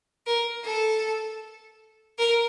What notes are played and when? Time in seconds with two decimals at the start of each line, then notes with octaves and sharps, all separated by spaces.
0.27 A#4
0.64 A4
2.19 A#4